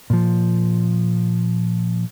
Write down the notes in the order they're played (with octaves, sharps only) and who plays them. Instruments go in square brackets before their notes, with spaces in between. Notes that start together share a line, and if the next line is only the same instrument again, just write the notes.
[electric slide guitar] A#2 F3